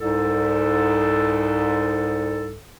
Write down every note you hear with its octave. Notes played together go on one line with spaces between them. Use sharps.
C2 G#2 A4